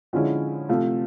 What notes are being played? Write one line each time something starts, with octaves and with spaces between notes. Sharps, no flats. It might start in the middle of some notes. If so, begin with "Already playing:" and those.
D3 F3 G#3 C#4 E4
C3 F3 A3